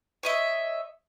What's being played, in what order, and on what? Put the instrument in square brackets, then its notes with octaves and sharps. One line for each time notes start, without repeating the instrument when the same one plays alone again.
[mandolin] C#5 D#5 E5